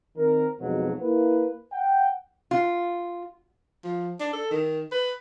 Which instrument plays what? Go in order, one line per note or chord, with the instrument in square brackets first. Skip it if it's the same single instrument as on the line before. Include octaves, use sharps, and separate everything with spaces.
[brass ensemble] D#3 C4 A#4
F2 G#2 B2 F#3
A#3 E4 B4
F#5 G5
[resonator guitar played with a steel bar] F4
[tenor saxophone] F3
D4
A4
D#3
B4